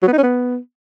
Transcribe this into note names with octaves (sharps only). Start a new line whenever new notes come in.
F#3
B3
D#4
C#4
B3